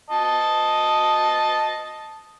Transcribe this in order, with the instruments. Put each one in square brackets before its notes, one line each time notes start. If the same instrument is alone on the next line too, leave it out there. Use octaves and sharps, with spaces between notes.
[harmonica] D#5 A5